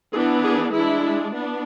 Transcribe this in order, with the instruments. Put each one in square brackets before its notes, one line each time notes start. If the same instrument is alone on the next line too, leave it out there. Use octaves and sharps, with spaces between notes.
[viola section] E3 B3 D4 G#4
G#4
G#3 D4 E4
B3 D4